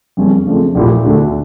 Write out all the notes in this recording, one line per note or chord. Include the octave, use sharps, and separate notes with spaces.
F2 C#3 G3 A#3 C#4
F2 C#3 F3 A3 D4
A#1 A#2 A3 E4 G4
D2 D3 A3 D4